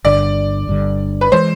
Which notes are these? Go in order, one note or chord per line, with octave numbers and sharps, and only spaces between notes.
G1 G2 D3 D5
G1 G2 D3
B4
E3 G#3 C5